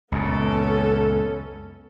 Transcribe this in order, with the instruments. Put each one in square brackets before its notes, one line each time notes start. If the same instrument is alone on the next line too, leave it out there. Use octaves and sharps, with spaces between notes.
[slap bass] C#2 F#2 A#2 [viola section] B3 C#4 A4